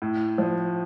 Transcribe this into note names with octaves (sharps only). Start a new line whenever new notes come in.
A2
F3